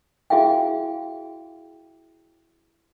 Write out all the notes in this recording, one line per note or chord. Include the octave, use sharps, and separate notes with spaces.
E4 F#4 G#4 E5 F5 G5